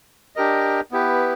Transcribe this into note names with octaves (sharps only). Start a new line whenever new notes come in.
D4 G4 A#4 D#5
B3 E4 G4 B4